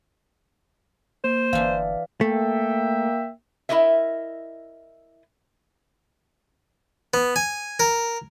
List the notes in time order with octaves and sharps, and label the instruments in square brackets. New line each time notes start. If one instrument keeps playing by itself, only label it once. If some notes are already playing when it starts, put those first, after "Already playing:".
[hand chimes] A#3 [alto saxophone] C5
[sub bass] G1 [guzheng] E3 D4 [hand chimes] F5
[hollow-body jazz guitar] A3 [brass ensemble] A#3 E5 G5
[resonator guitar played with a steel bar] E4 G4 A#4 D#5 E5
[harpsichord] B3
G#5
A#4